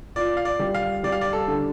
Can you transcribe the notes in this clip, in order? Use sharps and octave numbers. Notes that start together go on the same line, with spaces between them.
F4 D5
F5
D5
G3
F5
G3 D5
F5
D5
A4
D3